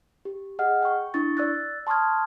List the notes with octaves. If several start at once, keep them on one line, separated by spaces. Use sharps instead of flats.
G4
G#4 D#5 F#5 F6
G5 C#6
D4 E4 C#6 A6
D5 E6 F#6 A6
A5 C6 C#6 D#6 F6 G#6